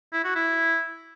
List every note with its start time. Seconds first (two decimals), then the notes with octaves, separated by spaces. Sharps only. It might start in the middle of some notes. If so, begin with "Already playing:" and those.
0.13 E4
0.24 F#4
0.35 E4